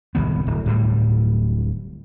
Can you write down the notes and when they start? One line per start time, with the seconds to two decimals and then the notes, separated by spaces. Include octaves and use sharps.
0.15 D1 C2 D#3 B3
0.47 D1
0.66 D1 A2 G3